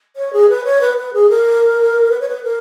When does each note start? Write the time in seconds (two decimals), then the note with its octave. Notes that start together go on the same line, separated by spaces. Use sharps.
0.16 C#5
0.33 G#4
0.49 B4
0.65 C#5
0.81 B4
0.97 B4
1.14 G#4
1.30 A#4
2.11 B4
2.20 C#5
2.29 B4
2.43 A#4